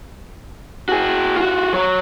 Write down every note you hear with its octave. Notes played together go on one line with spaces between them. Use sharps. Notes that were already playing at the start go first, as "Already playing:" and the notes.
F#4 G#4
F4 F#4
F#3 C#5